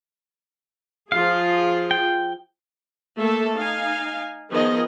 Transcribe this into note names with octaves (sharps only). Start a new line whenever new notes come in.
F3 F4 G#4 F5
G5
A3 A#3 A4 E5
D#4 F5 G#5
D#3 F3 B3 G#4 D#5